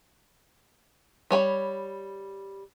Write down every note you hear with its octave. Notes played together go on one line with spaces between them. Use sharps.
G3 C#5 G#5 B5